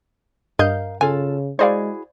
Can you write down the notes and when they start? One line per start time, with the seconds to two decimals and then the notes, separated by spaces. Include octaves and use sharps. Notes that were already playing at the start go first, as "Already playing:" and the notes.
0.59 G2 A#4 D#5 F5 G6
1.01 C#3 F4 A4 G#5
1.59 G#3 E4 F#4 G#4 C5 D5 F5